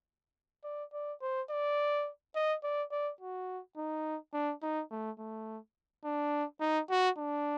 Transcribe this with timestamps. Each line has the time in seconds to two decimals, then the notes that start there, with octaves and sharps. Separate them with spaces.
0.64 D5
0.93 D5
1.22 C5
1.50 D5
2.35 D#5
2.63 D5
2.91 D5
3.21 F#4
3.77 D#4
4.33 D4
4.62 D#4
4.91 A3
5.18 A3
6.05 D4
6.60 D#4
6.90 F#4
7.18 D4